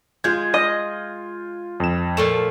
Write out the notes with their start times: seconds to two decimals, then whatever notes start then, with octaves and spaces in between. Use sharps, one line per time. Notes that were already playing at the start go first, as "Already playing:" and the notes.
0.24 G#3 F4 G6 G#6
0.54 D#5
1.80 F2 E7
2.17 A#2 F3 A3 E7